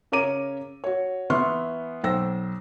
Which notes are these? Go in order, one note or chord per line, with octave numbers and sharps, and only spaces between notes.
C#3 A#4 C#5 A#5 D6 D#7
F#4 C#5
E3 B3 E5 C6 C#6 F6
B1 C5 G5 E6 A#6